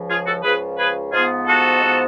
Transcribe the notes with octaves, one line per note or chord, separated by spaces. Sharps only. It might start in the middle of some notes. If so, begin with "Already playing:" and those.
Already playing: C#2 C#3 F3
F4 G#4
F#4 A4
C#2 C#3 F3 G#4 B4
G#4 B4
G#2 F3 B3 F4 G#4
F#4 A4
G#2 F3 B3